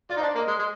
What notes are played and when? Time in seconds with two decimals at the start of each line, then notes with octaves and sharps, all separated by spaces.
0.10 F4 D5
0.17 D#4
0.20 C5
0.22 D4
0.28 D5
0.35 A#3
0.38 D#5
0.47 G#3
0.59 G#3